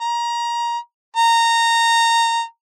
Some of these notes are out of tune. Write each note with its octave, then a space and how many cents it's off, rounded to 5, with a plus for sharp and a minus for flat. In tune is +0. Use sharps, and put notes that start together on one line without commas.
A#5 +20
A#5 -15